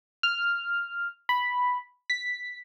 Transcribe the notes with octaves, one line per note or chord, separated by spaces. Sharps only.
F6
B5
B6